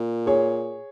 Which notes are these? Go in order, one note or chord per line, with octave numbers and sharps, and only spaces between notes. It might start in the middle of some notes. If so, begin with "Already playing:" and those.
Already playing: A#2
G#4 C#5